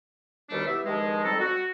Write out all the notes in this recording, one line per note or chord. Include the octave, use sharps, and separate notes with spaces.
D#2 B2 D#3 G3 A3 D4
B3 E4 G4 E5
G2 D#3 F3 G#3
F2 D#3 G3 C4 A4 A#5
F#4